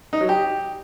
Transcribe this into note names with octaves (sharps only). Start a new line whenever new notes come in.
D#4
F#3
G4